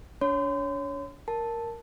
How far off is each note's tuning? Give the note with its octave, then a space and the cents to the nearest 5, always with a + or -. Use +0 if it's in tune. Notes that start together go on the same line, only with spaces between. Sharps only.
D4 -35 C#5 +0 C6 -40
A#4 +0 A5 +0